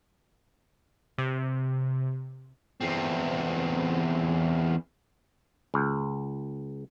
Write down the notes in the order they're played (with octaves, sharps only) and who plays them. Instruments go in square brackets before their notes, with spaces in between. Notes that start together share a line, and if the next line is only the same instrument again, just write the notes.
[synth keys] C3
[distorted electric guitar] E2 C4
[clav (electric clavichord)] C#2